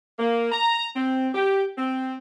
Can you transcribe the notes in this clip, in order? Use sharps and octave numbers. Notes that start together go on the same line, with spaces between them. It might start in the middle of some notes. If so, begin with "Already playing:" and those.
A#3
A#5
C4
G4
C4